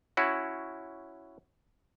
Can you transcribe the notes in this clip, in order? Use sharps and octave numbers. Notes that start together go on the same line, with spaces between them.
C#4 E4 F#4